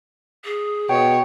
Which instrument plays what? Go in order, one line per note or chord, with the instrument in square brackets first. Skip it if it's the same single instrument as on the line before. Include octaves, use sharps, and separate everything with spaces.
[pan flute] G#4
[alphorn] B2 [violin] C#5 [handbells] G5